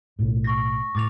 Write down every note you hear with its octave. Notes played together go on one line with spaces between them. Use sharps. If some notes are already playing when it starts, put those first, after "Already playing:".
B1 A2
C#6 A#6
A2 D6 A6 F7